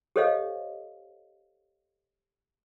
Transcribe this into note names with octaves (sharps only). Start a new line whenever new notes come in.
G4 A4 C5 C#5 D#5 F5